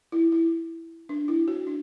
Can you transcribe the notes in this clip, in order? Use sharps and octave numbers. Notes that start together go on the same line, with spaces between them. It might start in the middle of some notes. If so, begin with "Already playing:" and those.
E4
E4
D4
E4
F#4
D4